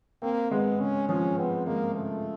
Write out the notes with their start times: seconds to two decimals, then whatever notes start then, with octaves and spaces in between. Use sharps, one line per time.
0.22 A#3 C4
0.51 G#3 B3
0.80 C#3 C#4
1.09 F3 C#4
1.38 B3 C4
1.67 G#3 A#3
1.95 C#3 A3